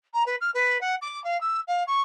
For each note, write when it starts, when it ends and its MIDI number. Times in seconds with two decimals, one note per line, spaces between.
0.14 0.24 82
0.26 0.36 71
0.41 0.51 89
0.54 0.81 71
0.81 0.96 78
1.02 1.23 86
1.24 1.39 77
1.41 1.61 88
1.68 1.84 77
1.87 2.02 85